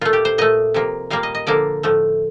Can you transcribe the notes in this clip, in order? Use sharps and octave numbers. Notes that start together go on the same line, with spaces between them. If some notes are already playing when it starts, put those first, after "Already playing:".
A#2 A3 F4
G4
C5
A#2 A3 D#5
C3 F3 A#3
A#2 G3 A#3 F5
D#5
D#5
D3 F3 A#3 D5
A2 F3 A3